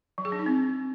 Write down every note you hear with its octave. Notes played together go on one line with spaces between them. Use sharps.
F#3
G#4
D4
D#4
C4